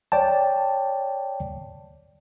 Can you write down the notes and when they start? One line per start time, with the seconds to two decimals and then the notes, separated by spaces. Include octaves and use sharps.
0.12 C#5 D5 G5 A5